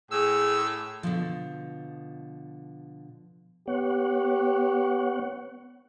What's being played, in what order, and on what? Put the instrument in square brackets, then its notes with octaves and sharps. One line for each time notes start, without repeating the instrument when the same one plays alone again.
[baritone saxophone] A2 [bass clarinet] G#4 [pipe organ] E6
[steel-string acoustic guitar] B2 D3 F3
[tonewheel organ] B3 C#5 F#5 [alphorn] G4